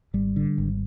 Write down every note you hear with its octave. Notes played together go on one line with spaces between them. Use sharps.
G#1 G3
D3
G#1